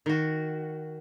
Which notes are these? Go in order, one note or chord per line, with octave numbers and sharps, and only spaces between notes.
D#3 F#4